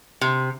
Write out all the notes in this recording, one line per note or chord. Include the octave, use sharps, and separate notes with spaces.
C3